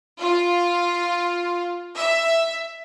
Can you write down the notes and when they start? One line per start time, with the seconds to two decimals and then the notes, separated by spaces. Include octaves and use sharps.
0.21 F4
1.96 E5